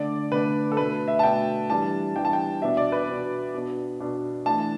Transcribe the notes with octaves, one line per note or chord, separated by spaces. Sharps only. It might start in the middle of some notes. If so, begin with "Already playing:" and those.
Already playing: D3 A3 D4 D5
D3 A3 D4 B4
A4
B2 A3 D4 B4
E5
A5
B2 A3 D4 G5
E3 G3 D4 A5
E3 G3 D4 G5
A5
G5
B2 B3 D4 E5
D5
B4
B2 B3 D4
B2 B3 D4
B2 B3 D4
E3 A3 D4 A5